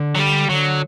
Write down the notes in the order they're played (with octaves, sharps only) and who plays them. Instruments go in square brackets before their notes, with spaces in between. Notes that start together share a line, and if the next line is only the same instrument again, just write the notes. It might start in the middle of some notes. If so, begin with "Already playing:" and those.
Already playing: [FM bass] D3
[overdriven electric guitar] F#3
G3
[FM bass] D3 [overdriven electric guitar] F#3